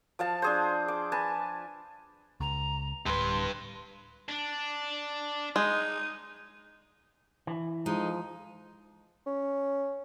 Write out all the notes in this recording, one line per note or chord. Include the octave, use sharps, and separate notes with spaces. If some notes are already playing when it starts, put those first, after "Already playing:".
F3 F5 A5
D4 G#4 C5
D6
B4 G#5 A5
C#2 A#5
D1 G2 B4 C6
D4
G#3 D#4
E3
F3 G#3 D#4
C#4